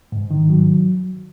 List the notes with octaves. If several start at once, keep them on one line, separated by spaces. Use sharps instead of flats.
G#2
D#3
F#3